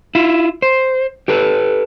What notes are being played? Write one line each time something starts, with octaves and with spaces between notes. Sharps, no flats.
E4 F4
C5
G4 A4 B4